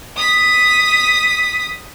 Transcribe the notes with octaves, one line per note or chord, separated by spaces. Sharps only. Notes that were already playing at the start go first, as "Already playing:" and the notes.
D#6 B6